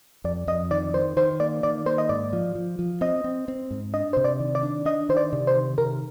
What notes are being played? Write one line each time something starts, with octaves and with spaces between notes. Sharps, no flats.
F2 D5
F2 D#5
D#3 D5
D#3 C5
D#3 C5
A#3 D5
D#3 D5
A#3 C5
D#5
G#2 D5
F3
F3
F3
C4 D#5
C4
C4
G#2
D4 D#5
C3 C5
D5
D#3
D5
D4
D4 D#5
D#3 C5
D5
C3
C5
D#3
C3 A#4